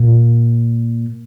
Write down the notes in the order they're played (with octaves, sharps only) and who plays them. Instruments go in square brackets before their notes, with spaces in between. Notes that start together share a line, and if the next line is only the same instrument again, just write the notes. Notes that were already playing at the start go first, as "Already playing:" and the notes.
Already playing: [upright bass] A#2